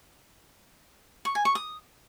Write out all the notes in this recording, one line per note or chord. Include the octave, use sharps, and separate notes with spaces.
C#6
G#5
C#6
D#6